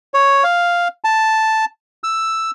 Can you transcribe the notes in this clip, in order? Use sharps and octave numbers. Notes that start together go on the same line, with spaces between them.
C#5
F5
A5
E6